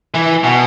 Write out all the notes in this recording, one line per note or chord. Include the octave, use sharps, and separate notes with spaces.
E3
B2